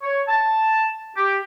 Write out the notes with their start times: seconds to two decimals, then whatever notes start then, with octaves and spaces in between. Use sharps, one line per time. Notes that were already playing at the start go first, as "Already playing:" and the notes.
0.02 C#5
0.28 A5
1.16 G4